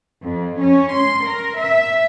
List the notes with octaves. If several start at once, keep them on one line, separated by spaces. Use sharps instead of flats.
F2
C#4
C6
A#4
E5